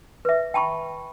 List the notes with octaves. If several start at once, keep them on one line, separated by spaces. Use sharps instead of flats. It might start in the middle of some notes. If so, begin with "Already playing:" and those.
B4 E5
G5 A5 B5 C#6